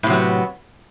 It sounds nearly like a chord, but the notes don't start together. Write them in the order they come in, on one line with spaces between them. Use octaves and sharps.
A2 C3 F#3 B3